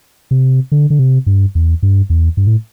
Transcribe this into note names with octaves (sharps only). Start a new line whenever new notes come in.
C3
D3
D3
C3
G2
E2
G2
E2
G2
A2